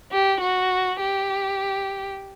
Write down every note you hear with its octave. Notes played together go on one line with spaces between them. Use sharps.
G4
F#4
G4